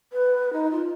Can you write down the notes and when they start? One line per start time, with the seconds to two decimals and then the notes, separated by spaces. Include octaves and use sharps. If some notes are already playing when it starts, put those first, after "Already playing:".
0.13 B4
0.53 D#4
0.71 F4